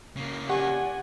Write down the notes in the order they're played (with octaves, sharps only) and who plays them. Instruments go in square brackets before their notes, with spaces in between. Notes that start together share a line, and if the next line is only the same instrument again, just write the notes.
[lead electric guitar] C#3 A#3
[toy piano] G4 [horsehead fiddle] D5 G#5 [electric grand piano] F#5